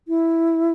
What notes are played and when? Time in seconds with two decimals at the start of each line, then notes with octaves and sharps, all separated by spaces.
0.08 E4